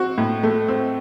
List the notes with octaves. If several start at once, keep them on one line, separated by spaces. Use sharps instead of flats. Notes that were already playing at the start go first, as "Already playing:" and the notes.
Already playing: C4 F#4
A2
A3
C4